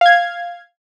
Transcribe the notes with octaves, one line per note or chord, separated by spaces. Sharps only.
F5 G#6